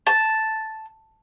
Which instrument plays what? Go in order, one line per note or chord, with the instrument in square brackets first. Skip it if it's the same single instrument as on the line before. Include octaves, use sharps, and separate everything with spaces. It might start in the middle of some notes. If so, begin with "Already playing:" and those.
[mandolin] A5